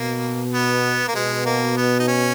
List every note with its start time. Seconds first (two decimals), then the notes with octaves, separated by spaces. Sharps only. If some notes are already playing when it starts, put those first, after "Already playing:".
Already playing: B2 A#3
0.54 B3
1.08 A#3
1.15 B2 G#3
1.46 A#3
1.77 B3
2.00 D#4
2.08 C#4